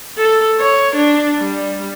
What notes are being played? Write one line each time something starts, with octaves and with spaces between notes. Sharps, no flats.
A4
C#5
D4
G3